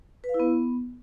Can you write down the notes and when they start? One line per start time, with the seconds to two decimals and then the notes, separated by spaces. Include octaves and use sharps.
0.24 B4
0.29 F5
0.34 E4
0.40 B3